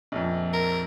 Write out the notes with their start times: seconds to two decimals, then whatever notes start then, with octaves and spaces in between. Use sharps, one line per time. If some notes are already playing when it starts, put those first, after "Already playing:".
0.12 A#1 F2
0.53 A#4